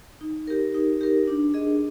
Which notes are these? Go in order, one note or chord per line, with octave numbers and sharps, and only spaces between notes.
D#4
G4 A#4
D#4
G4 A#4
D4
G#4 D#5